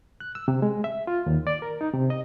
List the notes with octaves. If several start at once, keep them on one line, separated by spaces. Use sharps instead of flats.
F#6
E6
C3
G#3
E5
F4
D#2
D5
A#4
D#4
C3
D#5